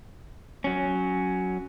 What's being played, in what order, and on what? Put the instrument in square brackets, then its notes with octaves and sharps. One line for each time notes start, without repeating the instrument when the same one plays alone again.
[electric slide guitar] F#3 C#4